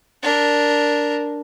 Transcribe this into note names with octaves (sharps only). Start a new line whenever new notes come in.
D4 A#4